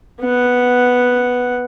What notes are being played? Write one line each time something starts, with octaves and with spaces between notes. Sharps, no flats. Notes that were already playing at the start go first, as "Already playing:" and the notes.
B3 F#5